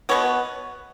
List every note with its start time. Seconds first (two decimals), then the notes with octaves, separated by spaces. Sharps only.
0.09 B2 G#3 B3 C#5